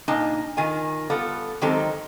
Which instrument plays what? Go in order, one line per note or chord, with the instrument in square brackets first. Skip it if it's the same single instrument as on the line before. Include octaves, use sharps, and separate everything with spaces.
[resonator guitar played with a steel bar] A#2 D4 D#4 A5
D#3 F4 G#5
G3 B3 F4 A4
D#3 F#3 G#3 C4 G4 A4